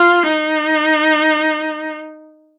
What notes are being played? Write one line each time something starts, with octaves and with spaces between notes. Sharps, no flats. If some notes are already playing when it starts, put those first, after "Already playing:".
Already playing: F4
D#4